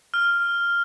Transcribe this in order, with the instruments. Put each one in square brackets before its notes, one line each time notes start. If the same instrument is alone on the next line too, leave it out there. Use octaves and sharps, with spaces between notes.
[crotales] F6